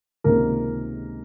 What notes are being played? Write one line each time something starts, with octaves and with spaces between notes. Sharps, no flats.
C#2 C3 D#3 G#3 A#3 A#4